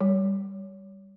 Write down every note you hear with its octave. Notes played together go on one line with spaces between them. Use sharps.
G3